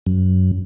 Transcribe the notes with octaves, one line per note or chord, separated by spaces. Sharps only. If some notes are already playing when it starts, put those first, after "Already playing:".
F#2